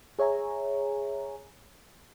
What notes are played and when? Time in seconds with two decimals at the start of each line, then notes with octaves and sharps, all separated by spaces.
0.19 G#4 C#5 E5 G#5 A#5